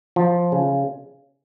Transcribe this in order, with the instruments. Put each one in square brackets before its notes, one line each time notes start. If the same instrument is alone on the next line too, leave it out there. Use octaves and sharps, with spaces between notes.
[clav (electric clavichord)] F3
C#3